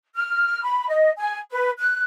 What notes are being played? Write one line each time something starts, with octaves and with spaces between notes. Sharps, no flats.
F6
B5
D#5
G#5
B4
F#6